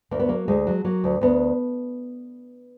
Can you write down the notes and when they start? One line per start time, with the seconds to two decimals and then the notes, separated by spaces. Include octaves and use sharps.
0.11 D2 A#3
0.19 B3
0.29 F#3 A#3
0.48 D2 G#3
0.67 F#3
0.85 F#3 A#3
1.04 D2
1.21 D2 B3